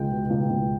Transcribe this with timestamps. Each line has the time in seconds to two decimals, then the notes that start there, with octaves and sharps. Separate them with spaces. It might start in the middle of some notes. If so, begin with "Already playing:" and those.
Already playing: C#2 G#3 G5
0.11 B2
0.30 C#2
0.50 C#2